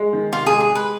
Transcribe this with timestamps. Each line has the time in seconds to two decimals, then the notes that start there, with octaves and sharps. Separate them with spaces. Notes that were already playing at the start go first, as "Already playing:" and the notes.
Already playing: G#3
0.13 D#3
0.32 C3 F4
0.46 G#3 G#4
0.60 G#4
0.71 G#3 B4